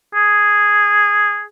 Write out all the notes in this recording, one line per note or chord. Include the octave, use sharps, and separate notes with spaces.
G#4